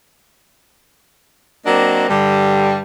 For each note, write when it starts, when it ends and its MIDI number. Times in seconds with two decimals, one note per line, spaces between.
1.66 2.09 54
1.66 2.09 58
1.66 2.09 60
1.66 2.09 62
1.66 2.09 75
2.10 2.82 43
2.10 2.82 50
2.10 2.82 55